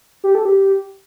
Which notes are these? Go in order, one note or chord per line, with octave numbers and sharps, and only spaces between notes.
G4
A4
G4